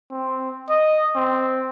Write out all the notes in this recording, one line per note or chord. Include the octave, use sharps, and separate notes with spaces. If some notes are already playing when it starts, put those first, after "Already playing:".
C4
D#5
C4